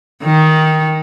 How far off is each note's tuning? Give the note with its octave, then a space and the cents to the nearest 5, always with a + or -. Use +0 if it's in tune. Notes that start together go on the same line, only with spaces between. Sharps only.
D#3 +10